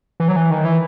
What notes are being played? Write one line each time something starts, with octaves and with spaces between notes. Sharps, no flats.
E3
F#3
E3
D#3
E3